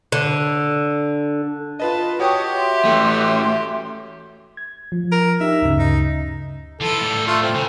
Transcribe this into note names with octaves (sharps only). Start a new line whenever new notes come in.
D3
F4 B4 D#5 A5
F#4 G4 C#5 G5 C#6 D#6
E5 C6
E3 A3
G#6
F3
A#4
D#4 G4 E5
D2 G2 C#3
D#4
E3 F4 A4
A2 G3
A3 F4 E6
C4
C#3